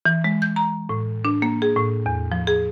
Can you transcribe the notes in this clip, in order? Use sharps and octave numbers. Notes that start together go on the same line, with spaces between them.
E3
G#3
G6
A#5
A2
D4
A#3
G#4
A2
E2
F3
G#4